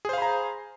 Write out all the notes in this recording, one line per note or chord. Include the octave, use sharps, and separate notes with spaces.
G#4 C5 F5 A#5 B5